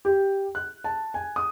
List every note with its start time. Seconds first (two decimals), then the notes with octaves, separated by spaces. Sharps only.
0.05 G4
0.55 F#6
0.84 A5
1.14 G#5
1.36 D#6